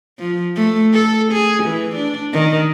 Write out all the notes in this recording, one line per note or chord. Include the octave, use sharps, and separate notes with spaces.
F3
A3
A4
G#4
E3
D4
D#3